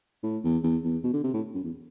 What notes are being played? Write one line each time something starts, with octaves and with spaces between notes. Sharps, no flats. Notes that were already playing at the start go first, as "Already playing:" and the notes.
A2
E2
E2
E2
B2
D3
C3
A2
F#2
E2